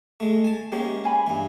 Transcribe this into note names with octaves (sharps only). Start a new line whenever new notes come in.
G#3 A3
G#5 A5
G#3 A#3 C#4 G4 C#5 E5
F5 G#5 B5
G2 E3